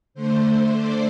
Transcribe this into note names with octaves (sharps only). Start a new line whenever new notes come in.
D3 A3 C5
D5